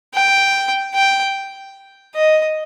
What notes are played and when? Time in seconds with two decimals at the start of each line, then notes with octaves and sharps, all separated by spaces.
0.14 G5
0.94 G5
2.15 D#5